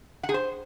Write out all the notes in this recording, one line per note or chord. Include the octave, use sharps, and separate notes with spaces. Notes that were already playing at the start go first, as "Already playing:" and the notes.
F#5
G#4
C5